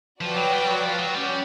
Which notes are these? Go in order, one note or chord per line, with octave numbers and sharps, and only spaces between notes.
F3 F#4 B4 D5 G5
F#3
G3
F#3
F3
F#3
G3 C#4 F#4